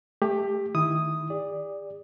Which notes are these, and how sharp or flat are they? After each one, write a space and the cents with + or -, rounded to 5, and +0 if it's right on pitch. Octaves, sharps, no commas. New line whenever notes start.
A3 +0 G4 +20
D#3 +0 E4 +0 D#6 +0
G#4 -45 D5 +0